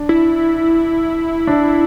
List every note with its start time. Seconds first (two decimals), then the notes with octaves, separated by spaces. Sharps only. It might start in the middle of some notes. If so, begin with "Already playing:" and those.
Already playing: D4
0.09 E4
1.47 D4